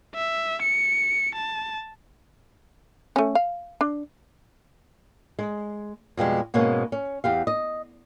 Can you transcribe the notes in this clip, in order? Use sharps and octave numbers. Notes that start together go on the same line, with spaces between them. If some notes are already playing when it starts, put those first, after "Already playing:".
E5
C#7
A5
A3 C#4
F5
D4
G#3
F2 B2 G3 G#3
G#2 B2 G#3 A#3 C#4
C#4
E2 G4 F5
D#5